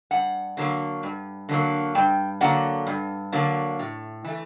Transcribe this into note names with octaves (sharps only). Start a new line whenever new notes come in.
G2 F#5
D3 F#3 A#3
G2
D3 F#3 A#3
G2 G5
D3 F#3 A#3 F#5
G2
D3 F#3 A#3
A2
E3 A3